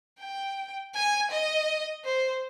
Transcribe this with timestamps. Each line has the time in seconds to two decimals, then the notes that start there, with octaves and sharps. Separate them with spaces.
0.19 G5
0.94 G#5
1.31 D#5
2.05 C5